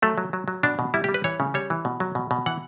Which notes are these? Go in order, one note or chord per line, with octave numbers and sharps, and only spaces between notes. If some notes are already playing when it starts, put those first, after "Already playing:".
F#3 A3
F#3
F#3
F#3
B2 D4
B2
G3 E4
G4
G3
B4
E3 C#5
C#3
G3 C#5
E3
B2
F#3
B2
B2
E3 F#5